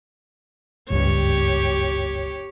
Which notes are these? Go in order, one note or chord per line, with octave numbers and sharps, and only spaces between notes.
F#1 C#2 G2 G4 C#5